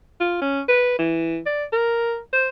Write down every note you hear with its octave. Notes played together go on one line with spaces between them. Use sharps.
F4
C#4
B4
E3
D5
A#4
C5